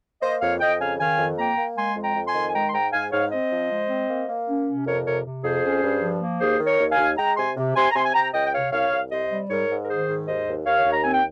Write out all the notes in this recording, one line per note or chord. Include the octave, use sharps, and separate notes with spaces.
A#3 C5 D#5
F2 C#5 F5
F2 D#5 G5
C#3 F5 G#5
D#3 F5 G#5
F2
A#3 G5 A#5
A#3
G#3 G#5 C6
F2
G5 A#5
F2
G#5 C6
D#3
G#5
G#3 G5 A#5
C6
G#2 G5 A#5
G#2 F5 G#5
G#2 C#5 F5
C4 C5 D#5
F3
G#3
C4
A#3
A#3
C#4
C3
F2 A#4 C#5
C3 A#4 C#5
C3
F2 G#4 C5
C#4
G2
F3
A#3
D#2 G#4 C5
D#3
A#4 C#5
D#2
F5 G#5
D#2
G#3 G5 A#5
C3 G#5 C6
C3
C3 G#5 C6
A#5
C3 G#5 C6
G#5
C3 G5 A#5
C#2 D#5 G5
G5
C3 C#5 F5
C2 C#5 F5
C2
C3 C5 D#5
G3
G#2 A#4 C#5
G#2
A#4
D#3 G#4 C5
G#2
D#2 C5 D#5
D#2
D#2 C#5 F5
D#2
A#5
C4 G#5
G5